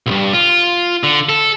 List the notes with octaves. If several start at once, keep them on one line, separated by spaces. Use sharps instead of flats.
B1 G2
F4
D3
A4